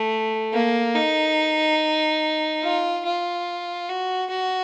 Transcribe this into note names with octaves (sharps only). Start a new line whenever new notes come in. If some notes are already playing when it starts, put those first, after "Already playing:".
Already playing: A3
A#3
D#4
F4
F4
F#4
F#4